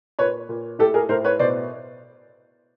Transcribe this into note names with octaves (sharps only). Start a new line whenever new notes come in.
A#2 B4 C#5
A#2
A2 G4 A4
G#4 A#4
A2 A#4 C5
B4 C#5
B2 C5 D5